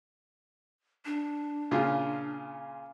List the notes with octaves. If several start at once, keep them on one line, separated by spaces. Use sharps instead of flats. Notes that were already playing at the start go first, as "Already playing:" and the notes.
D4
A#2 C#3 F4